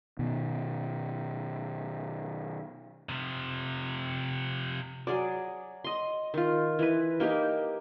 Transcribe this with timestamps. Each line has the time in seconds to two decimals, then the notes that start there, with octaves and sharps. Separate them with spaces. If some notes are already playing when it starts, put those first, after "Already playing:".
0.19 B2 D#3
3.09 C3 F3
5.07 F#3 G#4 D5
5.84 D#5 C6
6.34 D#3 F4
6.79 E3 B4
7.20 A#3 D#4 G4 A#4